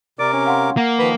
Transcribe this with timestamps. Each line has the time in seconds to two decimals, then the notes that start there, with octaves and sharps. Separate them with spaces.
0.19 C3 A#4 D5 D6 D7
0.33 C#4
0.46 F5 F#5 C6
0.77 A#3 F#5
0.99 D#3 F3 B4